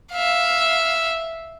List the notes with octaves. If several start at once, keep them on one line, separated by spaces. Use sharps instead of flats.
E5 F5